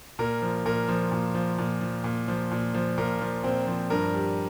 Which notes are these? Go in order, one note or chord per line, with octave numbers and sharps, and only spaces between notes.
A#2 A#4
F3
A#2 A#4
F3
A#2
F3
A#2
F3
A#2
F3
A#2
F3
A#2 A#4
F3
A#2 C4
F3
G2 A#4
G3